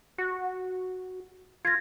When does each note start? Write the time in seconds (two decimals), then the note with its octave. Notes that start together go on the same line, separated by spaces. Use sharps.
0.18 F#4
1.65 F4 G#6 A#6